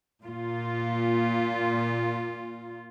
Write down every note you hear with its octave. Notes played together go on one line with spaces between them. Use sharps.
A#2 F4